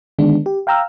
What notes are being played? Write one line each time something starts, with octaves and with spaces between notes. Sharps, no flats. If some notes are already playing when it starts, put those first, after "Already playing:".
D3 D#3 G#3 B3 D4
G4
F5 G5 A#5 E6 F6